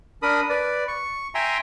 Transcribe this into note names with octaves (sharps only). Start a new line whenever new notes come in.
D4 A#4 B5 D#6
B4 D5
C#6
E5 G5 G#5 A#5 C6